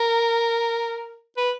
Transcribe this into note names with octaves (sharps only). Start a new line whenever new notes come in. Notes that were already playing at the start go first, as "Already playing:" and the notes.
Already playing: A#4
B4